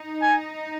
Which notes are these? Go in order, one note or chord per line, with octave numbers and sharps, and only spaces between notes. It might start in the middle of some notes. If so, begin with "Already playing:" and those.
Already playing: D#4
G#5